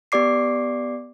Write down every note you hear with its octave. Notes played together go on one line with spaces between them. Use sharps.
B3 G4 D5 D6 C7